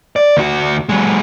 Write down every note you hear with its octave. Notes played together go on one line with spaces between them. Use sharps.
D5
D2 F#4
F#3 G#3